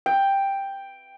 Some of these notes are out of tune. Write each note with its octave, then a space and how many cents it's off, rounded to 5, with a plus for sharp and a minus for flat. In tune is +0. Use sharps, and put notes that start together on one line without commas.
G5 +5